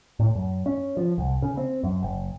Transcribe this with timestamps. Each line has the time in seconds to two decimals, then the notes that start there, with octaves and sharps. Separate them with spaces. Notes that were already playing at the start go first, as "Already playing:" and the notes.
0.19 A2
0.36 F#2
0.66 C#4
0.97 F3
1.18 C2
1.42 C#3
1.57 C4
1.84 F#2
2.03 F#1